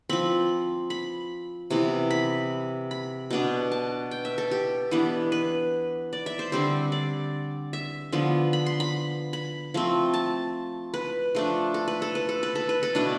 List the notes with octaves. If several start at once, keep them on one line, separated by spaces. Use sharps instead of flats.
F3 C4 B5
B5
C3 E3 B3
B5
B5
B2 B3 D4
A5
G5
E5
A4
G4
E3 B3 D4
B4
D5
E5
C5
D3 G3 C4 C5
D5
E5
D3 F3 B3
B5
C6
B5
B5
F3 A3 C4
A5
B4
F3 A3 D4
A4
B4
A4
B4
A4
B4
A4
B4
A4
B2 A3 D4 B4